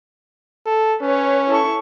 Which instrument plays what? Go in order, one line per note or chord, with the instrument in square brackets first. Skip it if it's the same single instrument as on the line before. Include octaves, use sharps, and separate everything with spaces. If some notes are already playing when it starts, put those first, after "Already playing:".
[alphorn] A4
[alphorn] C#4 [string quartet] B4 C#5
[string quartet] E4 A4 C#6